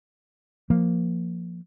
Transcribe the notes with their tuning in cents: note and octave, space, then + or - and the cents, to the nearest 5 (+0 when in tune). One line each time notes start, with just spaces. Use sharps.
F3 +0 A#3 +0